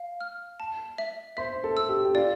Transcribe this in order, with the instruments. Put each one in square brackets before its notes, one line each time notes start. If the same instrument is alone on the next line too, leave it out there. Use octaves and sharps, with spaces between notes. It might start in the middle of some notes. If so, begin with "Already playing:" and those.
Already playing: [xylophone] F5
F6
A5
E5
[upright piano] C5 [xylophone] E5
[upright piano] A4
[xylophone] E6
[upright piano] G4
G4
[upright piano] F4 [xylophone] D5